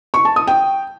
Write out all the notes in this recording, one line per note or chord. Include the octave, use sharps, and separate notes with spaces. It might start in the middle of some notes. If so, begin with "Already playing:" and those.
C#6
A5
D#6
G5